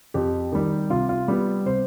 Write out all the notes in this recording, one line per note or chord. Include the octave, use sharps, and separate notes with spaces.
F2 G4
D#3 G3
C3 F4
F4
G3 B3
C3 C5